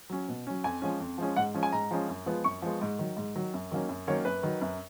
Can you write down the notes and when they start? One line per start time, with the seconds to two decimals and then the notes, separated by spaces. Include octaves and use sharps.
0.10 F#3 C#4
0.28 B2
0.47 F#3 C#4
0.64 F2 G#5
0.82 F3 G#3 C#4
1.00 F2
1.18 F3 G#3 C#4
1.36 G#2 F#5
1.54 F3 G#3 C#4
1.63 G#5
1.72 G#2 A#5
1.91 F3 G#3 C#4
2.08 F#2
2.26 F3 G#3 B3
2.44 F#2 C#6
2.62 F3 G#3 B3
2.81 G#2
2.99 D#3 F#3
3.17 G#2
3.36 D#3 F#3
3.54 F#2
3.71 D#3 F#3 A#3 C#4
3.89 F#2
4.07 D#3 F#3 A#3 C#4 C#5
4.25 F#2 B4
4.43 D#3 F#3
4.61 F#2